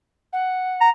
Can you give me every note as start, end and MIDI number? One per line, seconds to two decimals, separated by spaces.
0.32 0.89 78
0.81 0.90 82